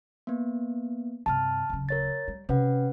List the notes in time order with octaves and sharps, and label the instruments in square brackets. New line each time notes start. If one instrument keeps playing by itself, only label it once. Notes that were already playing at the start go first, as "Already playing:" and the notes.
[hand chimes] A#3 B3
[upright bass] G2 C3 [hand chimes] A5 F6
[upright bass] D1 C#3
[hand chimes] A#4 C#5 A6
[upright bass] G3
[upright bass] C3 [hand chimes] C#4 B4 F#5